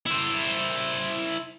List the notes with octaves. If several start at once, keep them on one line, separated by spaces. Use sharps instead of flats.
E4 C5